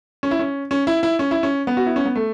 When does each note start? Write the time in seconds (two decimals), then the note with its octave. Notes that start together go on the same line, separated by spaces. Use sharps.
0.23 C#4
0.31 E4
0.39 C#4
0.71 C#4
0.87 E4
1.03 E4
1.19 C#4
1.31 E4
1.43 C#4
1.67 B3
1.77 F#4
1.86 E4
1.96 C#4
2.05 B3
2.16 A3